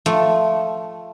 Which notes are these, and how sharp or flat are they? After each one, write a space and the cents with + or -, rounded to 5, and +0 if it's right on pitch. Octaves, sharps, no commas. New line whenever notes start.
F3 +0 A3 +0